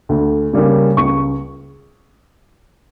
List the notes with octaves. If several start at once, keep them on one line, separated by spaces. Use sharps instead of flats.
D2
C#3 G3 A#3 C#4
C#2 C#6